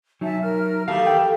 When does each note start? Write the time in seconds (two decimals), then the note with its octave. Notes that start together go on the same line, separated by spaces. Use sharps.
0.21 F#3 D#4 E5 G#5 A5
0.42 A#4 F6
0.88 D#2 A3 G4 F5
1.07 G5